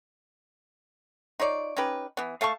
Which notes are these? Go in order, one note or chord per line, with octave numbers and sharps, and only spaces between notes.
D#4 F4 C#5 D5
C#4 D#4 G4 B4
E3 B3
A3 F5 A5 C#6